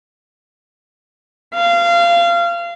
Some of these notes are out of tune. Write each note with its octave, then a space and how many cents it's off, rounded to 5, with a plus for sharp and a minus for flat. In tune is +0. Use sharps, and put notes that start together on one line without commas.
F5 -25